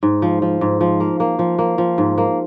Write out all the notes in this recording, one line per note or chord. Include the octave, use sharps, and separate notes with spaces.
G#2
F3
F3
G#2
F3
A#3
A#3
F3
A#3
F3
G#2
A#3